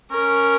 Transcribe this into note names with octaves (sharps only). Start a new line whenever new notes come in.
C#4 A#4